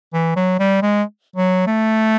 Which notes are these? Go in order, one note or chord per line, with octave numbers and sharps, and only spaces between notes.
E3
F#3
G3
G#3
F#3
A3